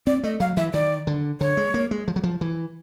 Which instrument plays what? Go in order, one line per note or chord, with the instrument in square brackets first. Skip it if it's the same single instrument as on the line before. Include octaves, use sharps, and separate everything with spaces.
[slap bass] C4 [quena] D5
[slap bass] A3 [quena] D#5
[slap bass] F#3 [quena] F5
[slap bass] E3 [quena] E5
[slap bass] D#3 [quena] D5
[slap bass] D3
[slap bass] D3 [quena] C#5
[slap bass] G#3
A#3
G#3
F3
F#3
F3
E3